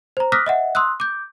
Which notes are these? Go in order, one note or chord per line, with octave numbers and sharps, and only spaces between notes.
C5 A#5
D6 D#6 F6 F#6 A#6 B6
D#5 E5 F#5
C6 D#6 E6 F#6
D6 G6